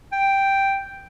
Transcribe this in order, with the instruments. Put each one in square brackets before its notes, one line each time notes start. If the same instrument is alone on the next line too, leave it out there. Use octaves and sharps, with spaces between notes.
[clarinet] G5